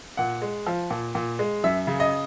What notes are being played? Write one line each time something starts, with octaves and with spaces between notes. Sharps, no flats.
A#2 F#5
G#3
F3
A#2
A#2
G#3
F#2 E5
C#3
D#5